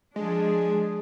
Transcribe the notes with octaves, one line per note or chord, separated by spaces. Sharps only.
F3 G#3 D4 G#4